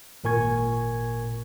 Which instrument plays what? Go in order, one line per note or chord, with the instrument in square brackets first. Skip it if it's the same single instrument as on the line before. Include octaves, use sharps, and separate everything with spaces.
[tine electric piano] G#1 A#2 A#4 G#5 C#6 G#6